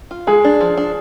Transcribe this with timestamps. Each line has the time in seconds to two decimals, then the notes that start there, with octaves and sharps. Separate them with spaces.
0.11 F4
0.27 G#3 G#4
0.44 D4
0.61 F3
0.77 D4